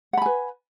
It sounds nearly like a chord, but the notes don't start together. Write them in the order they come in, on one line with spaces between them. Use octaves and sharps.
F#5 B5 G#5 B4